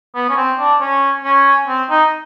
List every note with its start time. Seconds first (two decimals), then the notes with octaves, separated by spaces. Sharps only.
0.15 B3
0.29 C#4
0.37 C4
0.59 D4
0.81 C#4
1.24 C#4
1.68 C4
1.90 D#4